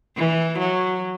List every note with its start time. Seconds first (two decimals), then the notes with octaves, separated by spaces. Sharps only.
0.16 E3
0.58 F#3